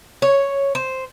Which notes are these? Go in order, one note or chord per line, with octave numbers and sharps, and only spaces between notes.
C#5
C5